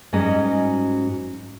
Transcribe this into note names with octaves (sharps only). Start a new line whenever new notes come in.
G#2 F#3 G3 C#4 D#5 G#5